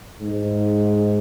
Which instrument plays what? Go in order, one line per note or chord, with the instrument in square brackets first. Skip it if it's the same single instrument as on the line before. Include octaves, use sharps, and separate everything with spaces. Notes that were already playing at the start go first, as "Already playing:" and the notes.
[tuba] G#2